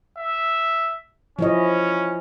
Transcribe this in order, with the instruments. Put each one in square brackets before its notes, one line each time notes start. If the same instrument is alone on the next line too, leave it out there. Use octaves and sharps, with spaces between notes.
[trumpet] E5
[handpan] F3 E4 D#5 [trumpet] C#4